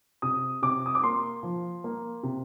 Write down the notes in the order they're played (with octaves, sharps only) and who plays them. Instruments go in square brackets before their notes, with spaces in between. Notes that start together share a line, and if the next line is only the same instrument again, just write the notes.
[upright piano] C3 D#6
C3 D6
D#6
D6
A#3 C6
F3
A#3
C3